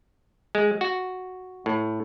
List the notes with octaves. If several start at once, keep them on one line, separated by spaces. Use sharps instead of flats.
G#3
F#4
A2